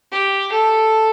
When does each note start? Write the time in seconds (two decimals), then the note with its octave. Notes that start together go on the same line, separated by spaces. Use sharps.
0.12 G4
0.53 A4